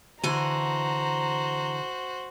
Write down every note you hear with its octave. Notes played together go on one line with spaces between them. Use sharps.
D3 E3 F#4 C5 G#5 A#5